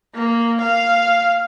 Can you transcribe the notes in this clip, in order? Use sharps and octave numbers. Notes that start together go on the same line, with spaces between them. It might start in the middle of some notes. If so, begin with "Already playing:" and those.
A#3
F5